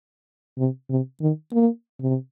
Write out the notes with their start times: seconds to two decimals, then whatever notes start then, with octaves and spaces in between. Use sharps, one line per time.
0.58 C3
0.90 C3
1.21 D#3
1.53 A#3
2.01 C3